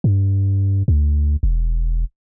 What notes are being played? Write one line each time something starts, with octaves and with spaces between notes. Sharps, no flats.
G2
D2
E1